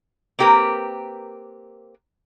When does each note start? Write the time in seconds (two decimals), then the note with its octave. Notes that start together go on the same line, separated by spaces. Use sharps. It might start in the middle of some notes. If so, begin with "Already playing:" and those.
0.39 A#3 C4 G4 A#4 B4